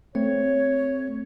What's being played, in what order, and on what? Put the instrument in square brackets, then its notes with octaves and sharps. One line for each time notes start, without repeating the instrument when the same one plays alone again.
[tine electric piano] A3 C4 [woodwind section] C#5